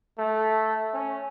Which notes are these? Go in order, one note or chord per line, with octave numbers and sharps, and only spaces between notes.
A3
C#4